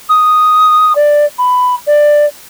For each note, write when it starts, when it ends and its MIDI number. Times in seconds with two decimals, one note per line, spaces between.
0.09 0.95 87
0.95 1.25 74
1.39 1.75 83
1.87 2.25 74